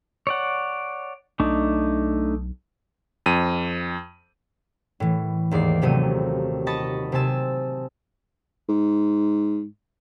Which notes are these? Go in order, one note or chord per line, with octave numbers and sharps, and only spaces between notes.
C#5 D5 F#5
B1 A3 D4 D#4
F2 D#7
A2 E3
D#2 G#2 A#3 D5 C7
D#1 C3 F#3 A3 D#7
D#5 A5 B5 C#6 A6
C3 C4 G#5 A5 E6
G#2